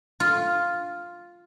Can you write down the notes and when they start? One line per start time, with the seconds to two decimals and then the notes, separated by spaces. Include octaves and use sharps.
0.20 F4